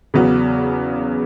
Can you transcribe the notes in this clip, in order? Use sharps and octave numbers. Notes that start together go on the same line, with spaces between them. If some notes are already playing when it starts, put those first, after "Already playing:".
E2 C#3 F#3 B3